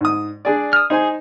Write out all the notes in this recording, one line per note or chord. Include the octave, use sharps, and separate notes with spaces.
G#2 D#6
D4 G#4 D5
D#6 F6
D#4 G#4 C5 G#5